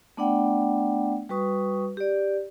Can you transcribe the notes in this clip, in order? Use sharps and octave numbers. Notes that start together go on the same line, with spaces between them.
A3 B3 D4 D5 F#5 G5
G3 F#4 B4 C#6 D#6
G4 D5